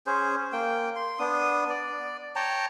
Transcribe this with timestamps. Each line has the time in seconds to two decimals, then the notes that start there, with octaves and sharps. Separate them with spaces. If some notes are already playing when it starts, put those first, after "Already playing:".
0.07 C#4 G#4 C5
0.53 A#3 G5
0.96 C6
1.19 B3 D4 D#6
1.69 D5
2.36 C#5 G5 A5 A#5